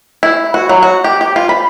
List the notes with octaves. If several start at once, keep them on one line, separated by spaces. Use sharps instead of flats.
E4
F#4
F#3
F#4
G4
G4
F4
B5